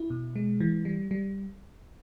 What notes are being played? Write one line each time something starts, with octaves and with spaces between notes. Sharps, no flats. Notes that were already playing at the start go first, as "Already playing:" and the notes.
Already playing: E4
B2
G#3
E3
G3
G3